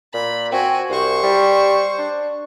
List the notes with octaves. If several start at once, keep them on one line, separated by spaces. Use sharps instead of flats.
A#2 B5
C4 F#4 G#5
C2 C5 C#6
G3
D4